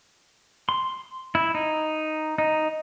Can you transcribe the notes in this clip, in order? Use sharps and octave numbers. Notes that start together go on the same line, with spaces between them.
C6
E4
D#4
D#4